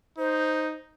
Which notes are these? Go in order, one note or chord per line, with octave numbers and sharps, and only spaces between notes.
D#4 C5